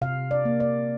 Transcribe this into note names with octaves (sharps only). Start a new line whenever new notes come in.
C3 F5
D5
A#3
D5